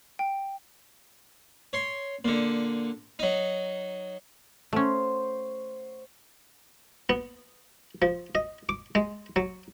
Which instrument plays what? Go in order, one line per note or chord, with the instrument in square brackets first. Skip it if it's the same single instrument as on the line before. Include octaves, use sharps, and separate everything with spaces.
[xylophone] G5
[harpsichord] C#5 C6
A#2 D3
F#3 D#4
[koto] A3 C#4 [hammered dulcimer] C5 C#5 F#5
[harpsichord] B3
F3
D#5
D6
G#3
F#3